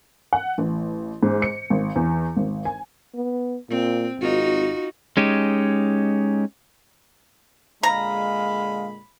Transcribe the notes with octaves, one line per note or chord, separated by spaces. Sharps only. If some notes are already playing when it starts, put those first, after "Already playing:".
F#5
A1
G#2
C#7
G#1
E2
G#1
G#5
B3
A#2 C4
G#1 D#4 F4 F#4
G#3 C#4 D#4 G4
A#2 D3 G#3 F5 A#5 B5